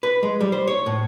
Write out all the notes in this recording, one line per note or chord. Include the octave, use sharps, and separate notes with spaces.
B4
G#3
G3
C5
C#5
A2